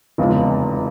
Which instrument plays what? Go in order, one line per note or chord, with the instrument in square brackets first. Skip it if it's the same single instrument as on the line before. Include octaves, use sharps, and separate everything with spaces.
[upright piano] F1 E2 C#3 F3 G#3